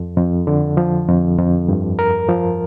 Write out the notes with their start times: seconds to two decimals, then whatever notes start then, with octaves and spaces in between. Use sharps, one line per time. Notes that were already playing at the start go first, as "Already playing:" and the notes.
Already playing: F2
0.17 F2
0.47 D3
0.77 F3
1.08 F2
1.38 F2
1.69 G2
1.99 A#4
2.29 F3